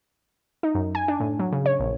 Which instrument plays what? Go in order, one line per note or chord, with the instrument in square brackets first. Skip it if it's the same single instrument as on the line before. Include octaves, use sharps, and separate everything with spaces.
[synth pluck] D#4
F#2
G#5
D4
A2
F#3
C#3
C#5
A#1